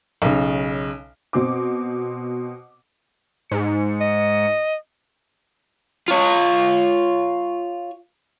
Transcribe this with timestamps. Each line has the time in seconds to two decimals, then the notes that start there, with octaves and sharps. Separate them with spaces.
0.22 B1 C#3
1.33 B2 C4 D6
3.50 G#2 C#7
4.01 D#5
6.08 F4 C#5